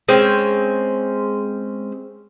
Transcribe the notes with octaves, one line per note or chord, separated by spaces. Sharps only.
G#3 C4 C#4 C#5